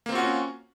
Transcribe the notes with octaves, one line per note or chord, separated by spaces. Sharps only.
A#3 C4 C#4 F4 F#4